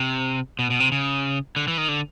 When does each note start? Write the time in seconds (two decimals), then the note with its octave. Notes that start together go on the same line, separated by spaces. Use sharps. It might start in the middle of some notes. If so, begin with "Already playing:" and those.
Already playing: C3
0.59 B2
0.70 B2
0.80 C3
0.92 C#3
1.56 D3
1.68 E3
1.78 D#3
1.88 D3